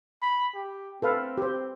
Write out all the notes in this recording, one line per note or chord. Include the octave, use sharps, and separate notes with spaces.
B5
G4
C4 A4 B4 F5
G4 C5